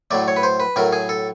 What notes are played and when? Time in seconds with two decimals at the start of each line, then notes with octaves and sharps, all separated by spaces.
0.11 A2 F#3 A3 D5
0.28 C#5
0.36 B4
0.43 C5
0.60 B4
0.76 A2 F#3 A3 A#4
0.93 G#4
1.09 A4